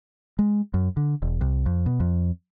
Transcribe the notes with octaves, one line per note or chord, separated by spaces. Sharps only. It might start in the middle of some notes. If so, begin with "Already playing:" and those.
G#3
F#2
D3
E1
C2
F2
B2
F2